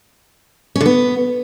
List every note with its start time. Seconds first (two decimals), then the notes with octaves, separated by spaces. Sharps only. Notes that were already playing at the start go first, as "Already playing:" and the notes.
0.75 C#4
0.81 D3
0.86 B3